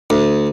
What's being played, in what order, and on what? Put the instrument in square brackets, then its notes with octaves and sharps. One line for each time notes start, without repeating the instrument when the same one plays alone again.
[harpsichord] D2